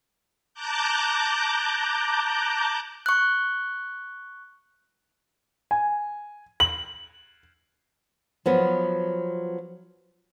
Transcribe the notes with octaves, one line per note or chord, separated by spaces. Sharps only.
A5 A#5 D6 F#6 G6
C#6 F#6
G#5
F#7
F3 F#3 B3